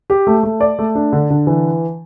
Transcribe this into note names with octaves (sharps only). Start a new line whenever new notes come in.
G4
A3
A3
D5
A3
D4
D3
D3
E3